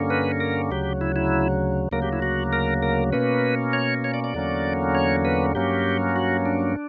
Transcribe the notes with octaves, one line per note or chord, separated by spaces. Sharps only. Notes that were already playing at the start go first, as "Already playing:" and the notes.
Already playing: G2 D3 A#3 C#4
B4
A#4
D2 C#3 F#3 G4
E4
E4
D2 C#3 F#3 A#3 A#4
G4
E4
F#4
A#4
A#4
B2 A#3 C#4 B4
C#5
C#5
D5
D5
E2 D3 F#3 A#3 C#4
C#5
B4
G2 F#3 A#3 C#4 G4
F#4
D4